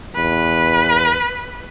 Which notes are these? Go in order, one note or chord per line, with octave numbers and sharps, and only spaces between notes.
E2 B4